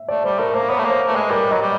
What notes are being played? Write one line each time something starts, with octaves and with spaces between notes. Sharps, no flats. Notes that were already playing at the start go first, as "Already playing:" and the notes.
Already playing: E5
A3 D5
G3 C5
A3 A#4
A#3 C5
B3 C#5
A3
A#3
C5
A3 B4
G#3
G3 A#4
F#3 D#5
G3